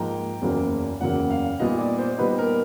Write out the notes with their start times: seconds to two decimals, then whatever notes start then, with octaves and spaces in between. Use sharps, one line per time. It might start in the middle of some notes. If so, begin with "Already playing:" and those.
Already playing: G#2 F3 A#3 G5 A#5
0.42 F#1 E2 C#3 F#3 A#3
1.01 F#1 E2 C#3 F#3 A#3 F#5
1.30 F5
1.60 A#2 G3 B3 D#4 D#5
1.79 D5
1.98 C5
2.18 A#2 G3 B3 D#4 B4
2.38 A#4